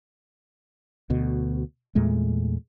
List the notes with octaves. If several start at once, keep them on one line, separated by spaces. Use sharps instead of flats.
D2 B2
E2 A#2 G#3 A3